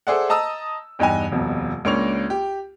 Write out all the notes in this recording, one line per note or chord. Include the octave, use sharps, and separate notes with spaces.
G#4 A4 C5 D5 E5 F#5
D#5 A5 A#5 D#6 E6
E2 G2 D#4 G5 G#5
D#1 F2 B2
C#2 A#3 C#4 D4 C#6 F7
G4